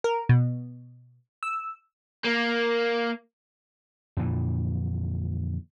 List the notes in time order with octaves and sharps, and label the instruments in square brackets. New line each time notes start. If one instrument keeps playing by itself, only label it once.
[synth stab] A#4
B2
E6
[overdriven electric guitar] A#3
[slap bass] F2 A#2 D3 E3